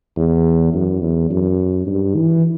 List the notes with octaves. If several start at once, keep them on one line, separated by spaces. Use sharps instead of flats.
E2
F#2
E2
F#2
G2
E3